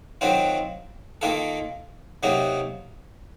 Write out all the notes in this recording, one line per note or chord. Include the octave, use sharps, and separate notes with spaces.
D#3 F#3 C4 F4
D#3 A#3 F4 A4
C3 F#3 A#3 D#4